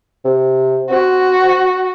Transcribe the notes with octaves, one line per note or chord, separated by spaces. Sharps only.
C3
C4 F#4